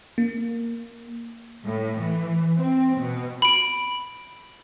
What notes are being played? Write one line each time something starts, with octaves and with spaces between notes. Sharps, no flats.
A#3
A2
E3
C4
B2
B5 D7